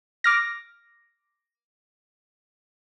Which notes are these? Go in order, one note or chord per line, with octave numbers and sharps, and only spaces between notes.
D6 F6 A#6